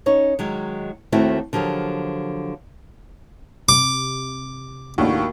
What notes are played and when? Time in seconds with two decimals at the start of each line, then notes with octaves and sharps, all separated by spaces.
0.06 C#4 D#4 C#5
0.39 D#3 F#3 G#3
1.12 D#2 D#3 A3 C4 E4 F#4
1.53 D3 F3 F#3 G4 A#4
3.69 C3 D6
4.98 D#2 A2 A#3 D4 F#4